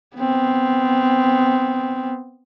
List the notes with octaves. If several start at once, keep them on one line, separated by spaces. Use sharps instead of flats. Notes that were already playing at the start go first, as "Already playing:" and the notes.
B3 C4